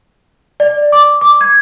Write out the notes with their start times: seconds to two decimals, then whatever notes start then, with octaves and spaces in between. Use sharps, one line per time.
0.60 D5
0.92 D6
1.21 D6
1.41 G#6